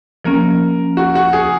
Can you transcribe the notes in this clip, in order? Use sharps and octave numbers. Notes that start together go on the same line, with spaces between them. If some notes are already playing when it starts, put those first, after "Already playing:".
F3 A#3 C#4 A#4
F#4
F#4
G#4